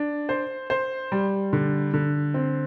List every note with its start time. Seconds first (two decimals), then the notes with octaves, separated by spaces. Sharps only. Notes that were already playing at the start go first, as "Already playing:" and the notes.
Already playing: D4
0.29 C5
0.70 C5
1.12 G3
1.53 D3
1.94 D3
2.34 C4